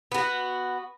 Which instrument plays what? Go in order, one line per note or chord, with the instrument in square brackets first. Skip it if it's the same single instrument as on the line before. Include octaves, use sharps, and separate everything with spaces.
[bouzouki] B3 F#4